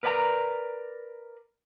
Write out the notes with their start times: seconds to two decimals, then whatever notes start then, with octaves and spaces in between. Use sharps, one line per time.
0.03 A#4 B4 D5 G5 A#5